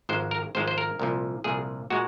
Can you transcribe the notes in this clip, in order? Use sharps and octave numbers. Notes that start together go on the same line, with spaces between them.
G#1 G#2 F3 G#3 C5
A#4
G#1 G#2 F3 G#3 C5
C5
A#4
C2 A#2 F3
C2 A#2 F3 G#4
A#2 G#3 F#4